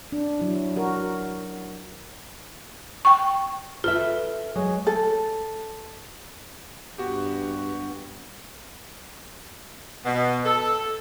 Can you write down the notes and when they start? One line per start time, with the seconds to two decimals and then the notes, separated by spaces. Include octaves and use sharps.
0.12 D4
0.40 F#3 E4
0.76 F#4 A#4
3.05 G5 C#6
3.84 F4 A4 B4 E5
4.56 F#3 G#3
4.87 A4
6.98 G2 B3 F#4 G4
10.05 B2
10.45 A4